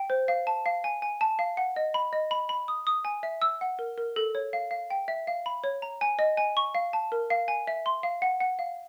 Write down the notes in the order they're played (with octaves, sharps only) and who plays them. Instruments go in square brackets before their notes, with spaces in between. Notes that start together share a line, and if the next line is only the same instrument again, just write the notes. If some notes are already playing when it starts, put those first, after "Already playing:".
Already playing: [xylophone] G5
C5
F5
A5
F5
G#5
G#5
A5
F5
F#5
D#5
B5
D#5
B5
B5
D#6
D#6
G#5
E5
E6
F#5
A#4
A#4
A4
C#5
F5
F5
G5
E5
F5
B5
C#5
A#5
G#5
D#5
G#5
C#6
F5
A5
A#4
F5
G#5
E5
C6
F5
F#5
F#5
F5